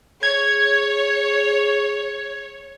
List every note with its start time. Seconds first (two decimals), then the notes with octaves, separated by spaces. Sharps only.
0.23 G#4 C#5 G#6